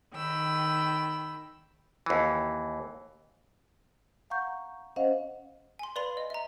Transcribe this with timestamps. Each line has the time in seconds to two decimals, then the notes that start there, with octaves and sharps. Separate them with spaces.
0.15 D#3 G5 B5 E6
2.06 D#2 E3
4.30 F5 F#5 A#5 C#6 G6
4.96 C#4 C5 D#5 F5 F#5
5.79 G#5 C6
5.96 B4 D5 F5 B5 C6 F7
6.17 D#5
6.30 E5 A#5